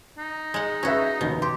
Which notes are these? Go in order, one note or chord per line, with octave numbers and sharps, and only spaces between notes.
D#4
G#3 F#5
C#4 F#4 G#4 B4 E5
F1 D#2 B2
G4 C6